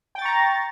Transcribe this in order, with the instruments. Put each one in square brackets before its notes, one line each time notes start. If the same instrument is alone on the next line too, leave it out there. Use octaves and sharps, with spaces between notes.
[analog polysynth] G5
A6
C#6
A#5